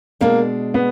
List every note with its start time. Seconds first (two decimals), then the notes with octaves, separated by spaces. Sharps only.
0.21 B2 G#3 A#3 D4
0.74 B3